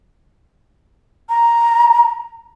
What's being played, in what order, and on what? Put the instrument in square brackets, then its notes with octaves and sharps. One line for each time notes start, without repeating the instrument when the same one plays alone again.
[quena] A#5